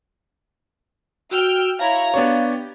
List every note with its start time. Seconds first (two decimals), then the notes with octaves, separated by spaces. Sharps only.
1.31 F#4 G5 E6 F6
1.79 E4 C#5 F5 A#5
2.14 B3 D4 G4 C#5